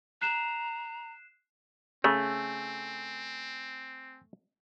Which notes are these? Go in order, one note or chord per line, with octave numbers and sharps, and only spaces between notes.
A#5 F#6 C7 E7
C#3 A3 C4 G#5